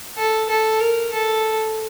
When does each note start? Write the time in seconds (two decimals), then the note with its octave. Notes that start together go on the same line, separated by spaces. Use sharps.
0.18 A4
0.49 A4
0.80 A#4
1.13 A4